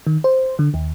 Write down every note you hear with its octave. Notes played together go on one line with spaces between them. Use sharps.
D#3
C5
D3
D#2